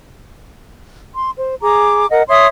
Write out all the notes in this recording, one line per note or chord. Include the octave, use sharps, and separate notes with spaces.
C6
C5
G#4 A#5 D6
A#4 D#5 F#5
C#5 E5 C6 D#6